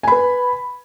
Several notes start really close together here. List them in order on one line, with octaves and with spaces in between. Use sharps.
G#5 B5 B4